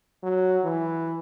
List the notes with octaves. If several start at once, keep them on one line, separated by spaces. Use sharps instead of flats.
F#3
E3